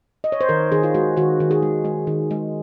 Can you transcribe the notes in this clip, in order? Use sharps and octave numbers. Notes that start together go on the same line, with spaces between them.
D#5
C#5
C5
D#3 A#4
D#3 G#4
F4
G#3 F#4
D#3 F#4
D#3
G#4
G#3
G#3
D#3
G#3